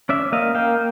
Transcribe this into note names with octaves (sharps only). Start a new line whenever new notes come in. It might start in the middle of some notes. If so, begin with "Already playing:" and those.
C#4 D5 E5
A#3 D#5 F5
A#3 F5 G5